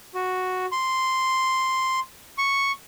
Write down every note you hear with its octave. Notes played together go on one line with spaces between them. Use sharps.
F#4
C6
C#6